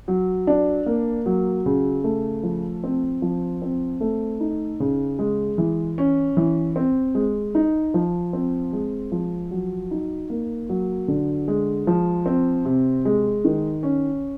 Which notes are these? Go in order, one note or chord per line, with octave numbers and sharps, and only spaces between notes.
F#3
D4
A#3
F#3
C#3
A3
F3
C4
F3
C4
A3
D#4
C#3
G#3
E3
C#4
E3
C4
G#3
D#4
F3
C4
G#3
F3
F#3
D#4
A#3
F#3
D3
G#3
F3
C4
C3
G#3
D#3
C#4